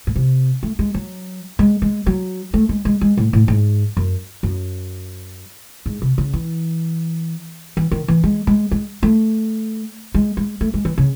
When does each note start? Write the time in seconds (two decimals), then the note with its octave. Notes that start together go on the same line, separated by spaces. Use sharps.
0.07 A2
0.16 C3
0.63 A3
0.79 G#3
0.94 F#3
1.59 G#3
1.82 G#3
2.07 F#3
2.54 A3
2.69 G#3
2.85 G#3
3.01 G#3
3.17 A2
3.33 A2
3.48 G#2
3.97 F#2
4.43 F#2
5.86 G#2
6.02 C3
6.18 C#3
6.33 E3
7.77 E3
7.91 D#3
8.08 E3
8.24 G#3
8.47 G#3
8.71 G#3
9.03 A3
10.14 G#3
10.37 G#3
10.61 A3
10.74 G#3
10.85 E3
10.98 C#3